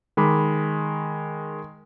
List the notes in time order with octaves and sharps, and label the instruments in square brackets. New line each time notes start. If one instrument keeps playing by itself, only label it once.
[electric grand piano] D#3 G#3 B5 D6